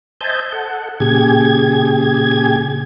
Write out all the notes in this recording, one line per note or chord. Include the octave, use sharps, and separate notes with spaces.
C5 D#5 E5 G#5 A5 G6
A4 F#5
A#2 C#3 G4 G#4 G#6